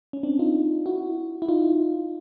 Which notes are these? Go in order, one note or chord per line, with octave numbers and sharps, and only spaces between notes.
C#4
C4 D4
D#4 F4
E4 F#4
E4
D#4 F4